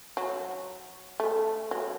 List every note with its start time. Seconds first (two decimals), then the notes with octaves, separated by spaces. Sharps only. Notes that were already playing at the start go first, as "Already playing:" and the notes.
0.17 F#3
1.20 A3
1.71 F#3